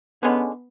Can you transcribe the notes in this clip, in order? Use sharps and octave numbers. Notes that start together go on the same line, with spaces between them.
D3 G#3 B3 C#4